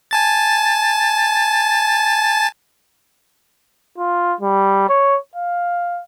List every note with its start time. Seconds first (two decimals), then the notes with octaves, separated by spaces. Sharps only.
0.11 G#5 A5 A6
3.98 F4
4.41 G3
4.89 C#5
5.35 F5